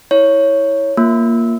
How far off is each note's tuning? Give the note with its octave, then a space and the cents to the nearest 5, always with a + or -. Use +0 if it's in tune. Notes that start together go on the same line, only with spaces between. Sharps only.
E4 -15 C#5 +0
A#3 +0 F4 -5